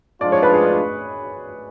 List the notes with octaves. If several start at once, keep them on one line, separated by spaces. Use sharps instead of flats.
G#2 F3 G#3 D4 F4 D5
C#5
B4
G#4
D5